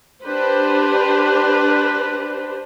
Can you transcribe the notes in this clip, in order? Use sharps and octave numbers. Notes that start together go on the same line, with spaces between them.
D4 G4 B4 C5